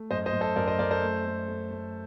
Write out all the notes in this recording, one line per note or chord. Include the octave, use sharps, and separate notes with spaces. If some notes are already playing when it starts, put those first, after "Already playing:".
Already playing: A3
F#2 C5 D#5
C5 D#5
F#2
A4 C5
F#2 A#4 D5
C5 D#5
F#2 A#4 D5
A4 C5
A3
A3
A3
A3